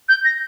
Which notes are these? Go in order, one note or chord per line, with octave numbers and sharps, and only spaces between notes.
G6
A#6